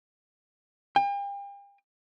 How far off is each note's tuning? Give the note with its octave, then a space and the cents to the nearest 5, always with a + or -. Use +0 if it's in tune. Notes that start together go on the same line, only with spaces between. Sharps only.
G5 +40